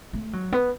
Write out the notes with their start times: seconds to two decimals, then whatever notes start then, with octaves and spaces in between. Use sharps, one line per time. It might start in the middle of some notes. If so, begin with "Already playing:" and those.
0.13 A3
0.33 F#3
0.52 B3